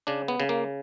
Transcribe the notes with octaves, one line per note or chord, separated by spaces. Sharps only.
C#3 D4
B3
C#3
A#3